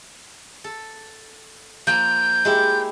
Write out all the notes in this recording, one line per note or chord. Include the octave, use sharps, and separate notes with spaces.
A4
F3 A#3 G6
G#3 E4 G4